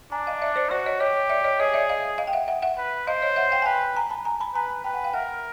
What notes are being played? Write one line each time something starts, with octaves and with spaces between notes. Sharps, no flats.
D4 G#5 A#5
D#5 F5
D5 E5
C5 D5
F#4 C5 D5
C#5 D#5
G4 C#5 D#5
D5 E5
C#5 D#5
G#4 C#5 D#5
D5 E5
D#5 F5
D#5 F5
G5
E5 F#5
E5 F#5
E5 F#5
B4
C5 D#5 F5
C#5 D#5
E5 F#5
F5 G5
G#5
B4 G5 A5
G#5 A#5
A5 B5
G#5 A#5
A5 B5
B4 G#5 A#5
B4 G5 A5
F#5 G#5
F5 G5
A#4 E5 F#5